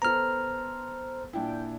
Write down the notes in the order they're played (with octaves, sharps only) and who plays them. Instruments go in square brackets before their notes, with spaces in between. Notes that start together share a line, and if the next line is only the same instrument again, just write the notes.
[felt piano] B3 A4 [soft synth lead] C5 [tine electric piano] A#5 F6
[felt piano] A#2 D4 E4 [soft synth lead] G5